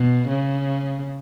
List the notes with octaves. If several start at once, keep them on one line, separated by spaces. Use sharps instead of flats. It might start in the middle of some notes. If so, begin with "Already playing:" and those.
Already playing: B2
C#3